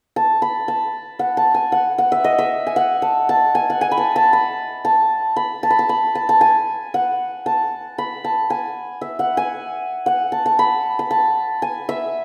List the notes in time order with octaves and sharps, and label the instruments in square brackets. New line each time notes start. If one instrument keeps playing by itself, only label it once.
[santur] A5
B5
A5
F#5
A5
G#5
F#5
F#5
E5
D#5
E5
G#5
F#5
A5
A5
G#5
F#5
G#5
B5
A5
A5
B5
A5
B5
A5
B5
A5
B5
A5
A5
G#5
F#5
A5
B5
A5
G#5
E5
F#5
G#5
F#5
A5
A5
B5
B5
A5
G#5
E5